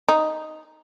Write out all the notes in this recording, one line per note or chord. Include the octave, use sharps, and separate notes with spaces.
D#4